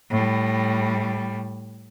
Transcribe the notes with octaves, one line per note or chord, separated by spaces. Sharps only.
A2 G3